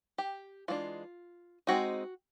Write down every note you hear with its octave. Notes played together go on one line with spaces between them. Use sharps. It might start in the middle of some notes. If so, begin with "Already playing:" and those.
G4
E3 G#3 B3 D4 F4
G#3 C4 D#4 F#4